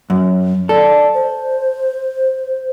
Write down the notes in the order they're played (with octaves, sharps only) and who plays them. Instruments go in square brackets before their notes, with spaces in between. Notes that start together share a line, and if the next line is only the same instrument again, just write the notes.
[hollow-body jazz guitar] F#2
[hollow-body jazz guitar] A4 [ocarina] D5
[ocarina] C5